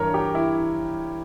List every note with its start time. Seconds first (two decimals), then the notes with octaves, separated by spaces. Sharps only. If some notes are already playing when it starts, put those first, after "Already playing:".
Already playing: G2 E3 A#4 C#5
0.14 G4
0.35 E4